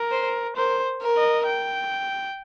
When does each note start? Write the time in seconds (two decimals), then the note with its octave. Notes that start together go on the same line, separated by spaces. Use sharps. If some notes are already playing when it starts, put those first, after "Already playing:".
Already playing: A#4
0.11 C5
0.56 A#4 C5
1.01 A#4
1.17 D#5
1.47 G5